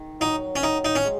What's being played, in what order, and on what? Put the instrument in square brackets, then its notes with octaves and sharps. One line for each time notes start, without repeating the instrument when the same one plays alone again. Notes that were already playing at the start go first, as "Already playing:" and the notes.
Already playing: [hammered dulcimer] D#3
[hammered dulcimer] F#3 [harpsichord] D#4
[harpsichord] C#4
[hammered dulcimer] D#3 [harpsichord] D#4
[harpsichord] D#4
C#4
[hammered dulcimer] G#3